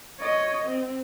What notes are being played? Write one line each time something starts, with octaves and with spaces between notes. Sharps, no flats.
C#5 D#5
C4